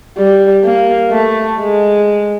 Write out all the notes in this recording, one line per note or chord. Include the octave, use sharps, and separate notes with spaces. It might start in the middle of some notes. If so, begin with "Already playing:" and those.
G3
A#3
A3
G#3